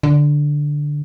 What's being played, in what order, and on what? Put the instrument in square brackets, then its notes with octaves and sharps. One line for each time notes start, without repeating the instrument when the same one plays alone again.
[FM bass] D3